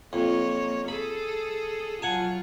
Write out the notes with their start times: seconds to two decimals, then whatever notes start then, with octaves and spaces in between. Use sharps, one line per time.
0.13 F2 A#3 C#5
0.88 G#4 A4 B5
2.02 F#3 F4 F#5 G#5 A5